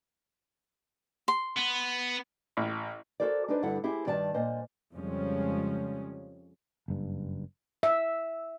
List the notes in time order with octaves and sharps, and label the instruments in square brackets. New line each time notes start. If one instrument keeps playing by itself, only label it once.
[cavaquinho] C6
[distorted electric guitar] B3
[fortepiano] A1
[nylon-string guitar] F#4 G4 A4 A#4 C5 D5
D4 D#4 B4 C5 D5
G2 D3 E4 A4 F#5
C4 E4 G4 G#4
G2 D#3 D5 G5 A5
A#2 C5 D#5
[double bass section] F2 C#3 F3 G3 G#3 C#4
[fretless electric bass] F#1 G2
[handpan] E5